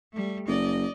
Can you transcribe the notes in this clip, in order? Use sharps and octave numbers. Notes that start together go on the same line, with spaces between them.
G3 A3
F#1 D5 D#5